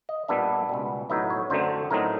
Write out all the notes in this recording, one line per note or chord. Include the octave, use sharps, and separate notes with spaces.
D#5
A#2 G3 B3 D4 E5
C#2 B2 G3
A2 F#3 B3 D#4 E5
C#5
F#2 D3 F#3 A3 C4 C5
A2 F#3 A3 C4 D#4 A#4